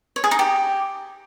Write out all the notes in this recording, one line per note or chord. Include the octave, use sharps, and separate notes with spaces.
C#5
G#4
D#4
G4